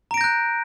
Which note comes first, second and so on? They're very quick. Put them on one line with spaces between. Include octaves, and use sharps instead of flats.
A#5 D7 A#6 G6 F#6